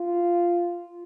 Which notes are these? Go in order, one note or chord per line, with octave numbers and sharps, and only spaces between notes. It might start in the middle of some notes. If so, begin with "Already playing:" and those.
Already playing: F4